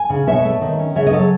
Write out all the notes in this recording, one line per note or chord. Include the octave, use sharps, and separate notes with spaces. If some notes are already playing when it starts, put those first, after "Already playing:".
Already playing: G#5
C#3
B2 C#5 E5
A3
D#3
C#4
C#3 C#5 E5
D#5
F#3 A4 C#5